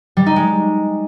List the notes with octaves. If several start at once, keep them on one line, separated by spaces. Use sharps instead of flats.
G3
D#4
G#3